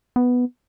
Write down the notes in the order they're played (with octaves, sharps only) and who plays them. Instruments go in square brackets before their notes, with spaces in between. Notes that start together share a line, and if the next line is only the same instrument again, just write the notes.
[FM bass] B3